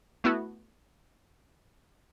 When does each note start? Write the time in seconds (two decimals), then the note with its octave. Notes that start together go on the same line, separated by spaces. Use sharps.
0.24 A3 B3 E4 F#4